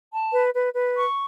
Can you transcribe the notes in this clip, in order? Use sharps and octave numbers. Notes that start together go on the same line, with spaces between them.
A5
B4
B4
B4
C#6